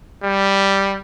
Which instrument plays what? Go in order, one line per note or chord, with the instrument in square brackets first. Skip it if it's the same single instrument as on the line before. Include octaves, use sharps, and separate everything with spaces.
[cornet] G3